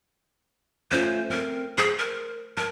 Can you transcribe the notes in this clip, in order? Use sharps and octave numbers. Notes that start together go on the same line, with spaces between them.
A3 C#4 F4 C5
C4 A#4
G#4 C5
A#4
A#4 A5